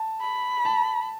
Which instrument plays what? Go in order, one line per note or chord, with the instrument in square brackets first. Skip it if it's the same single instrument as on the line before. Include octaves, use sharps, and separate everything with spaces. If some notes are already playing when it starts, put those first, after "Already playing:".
Already playing: [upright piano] A5
[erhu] B5
[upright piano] A5